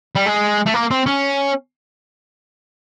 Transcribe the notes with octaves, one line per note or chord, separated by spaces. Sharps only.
G3
G#3
A3
A#3
C4
C#4